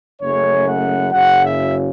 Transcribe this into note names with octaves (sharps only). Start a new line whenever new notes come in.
F#1 F#2 C#3 A3 C#4 C#5
F#5
F#1 F#2 C#3 F#3 F#5
E5